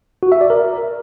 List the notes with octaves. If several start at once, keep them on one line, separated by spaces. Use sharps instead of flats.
F#4
E5
D5
A#4